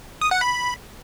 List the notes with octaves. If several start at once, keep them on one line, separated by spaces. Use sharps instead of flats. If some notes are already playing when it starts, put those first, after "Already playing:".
D#6
F#5
B5